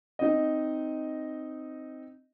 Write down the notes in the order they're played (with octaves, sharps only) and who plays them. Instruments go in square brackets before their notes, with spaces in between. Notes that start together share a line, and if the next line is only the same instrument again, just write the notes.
[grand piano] C4 D#4 D#5